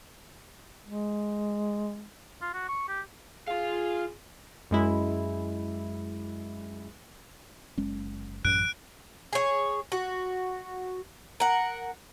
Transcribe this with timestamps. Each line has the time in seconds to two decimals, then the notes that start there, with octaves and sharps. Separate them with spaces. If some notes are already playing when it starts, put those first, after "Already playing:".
0.85 G#3
2.42 F4
2.54 F#4
2.69 C#6
2.89 G4
3.48 F4 G#4 F5
4.71 F#2 G#3 E4
7.78 F#1 G#3 C#4
8.45 A1 F#2 F#6 D7
9.33 G#4 C#5
9.92 F#4
11.40 A#4 F#5